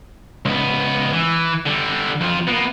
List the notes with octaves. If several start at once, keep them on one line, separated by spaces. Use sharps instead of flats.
C#2 B3
E3
D3 G3
F2 F4
A#3 B3